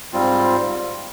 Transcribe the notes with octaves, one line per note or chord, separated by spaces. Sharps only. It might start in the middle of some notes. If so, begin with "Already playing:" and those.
G#2 G3 C4 F4